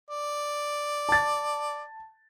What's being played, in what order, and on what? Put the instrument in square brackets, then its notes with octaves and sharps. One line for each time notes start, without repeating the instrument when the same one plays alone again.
[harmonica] D5
[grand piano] A5 A6